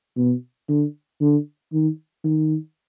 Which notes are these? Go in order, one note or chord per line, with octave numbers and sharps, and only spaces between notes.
B2
D3
D3
D#3
D#3